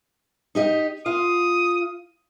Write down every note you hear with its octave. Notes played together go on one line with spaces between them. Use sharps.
D#4 G4 D#5
F4 F5 D#6